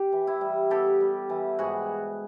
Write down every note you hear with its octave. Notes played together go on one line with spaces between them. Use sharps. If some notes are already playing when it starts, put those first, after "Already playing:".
Already playing: G4
E3
E4
G3
B3 G4 A4
G3
E3
G#2 F#4 G#4